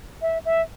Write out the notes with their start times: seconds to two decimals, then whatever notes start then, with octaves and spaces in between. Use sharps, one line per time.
0.22 E5
0.45 E5